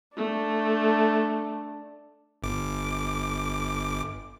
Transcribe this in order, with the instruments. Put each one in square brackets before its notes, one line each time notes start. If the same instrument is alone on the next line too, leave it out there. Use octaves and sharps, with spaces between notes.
[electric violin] A3 [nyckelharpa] D4
[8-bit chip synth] G1 D6